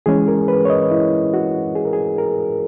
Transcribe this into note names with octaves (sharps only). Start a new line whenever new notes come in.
E3 G#3 C#4 G#4
A#4
B4
C#5
D#5
E4
F#4
G#4
A#4
G#4
A#4